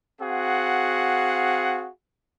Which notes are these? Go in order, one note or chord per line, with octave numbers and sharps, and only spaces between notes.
C4 F#4 G#4 F5 F#5